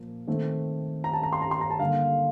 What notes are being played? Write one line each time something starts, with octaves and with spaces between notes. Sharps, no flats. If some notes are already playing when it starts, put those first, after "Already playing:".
Already playing: A#2 F3 A#3
D#3 A3 C4
A#5
A5
A#5
C6
A#5
C6
A#5
A5
D3 G3 A#3 F5